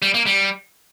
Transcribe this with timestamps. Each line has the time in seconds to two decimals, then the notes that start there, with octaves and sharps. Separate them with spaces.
0.02 G3
0.14 A#3
0.26 G3